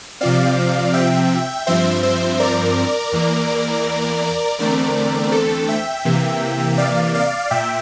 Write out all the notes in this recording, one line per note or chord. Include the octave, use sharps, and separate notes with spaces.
C3 F3 C4 D5 F5
E5 G5
G2 F3 C4 C5 E5
C5 E5
A#4 D5
E2 E3 A#3
E2 D3 A3 C4 A#4 D5
A4
E5 G5
C3 E3 A#3
D5 F5
D5 F5
A#2 E5 G5